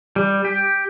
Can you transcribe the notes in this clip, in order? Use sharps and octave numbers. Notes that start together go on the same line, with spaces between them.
G3
G4